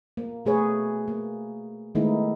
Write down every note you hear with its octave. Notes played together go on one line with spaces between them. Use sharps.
A#3
B2 A3 G#4 B4 C#5
A#3
D#3 G#3 A3 B3 D#4 E4